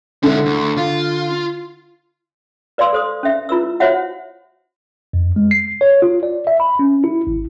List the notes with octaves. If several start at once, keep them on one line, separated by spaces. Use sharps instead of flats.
D3 G#3 E4
D2
F4
B4 D5 F5 C6 E6
A4 C5 D#6
C#4 E5
E4 F4 B4 E6
F#4 C5 C#5 E5 F#5
F2
G#3
C7
C#5
F4
D5
E5
B5
C#4
E4
G#1